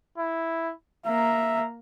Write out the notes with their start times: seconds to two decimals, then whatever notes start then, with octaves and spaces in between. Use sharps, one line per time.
0.18 E4
1.06 A#3 E5 A#5